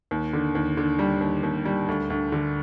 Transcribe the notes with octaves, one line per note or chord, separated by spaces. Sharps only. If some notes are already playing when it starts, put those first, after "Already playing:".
D#2
D3
D#2
D3
G3
D#2
D#2
G3
D2
D2
D3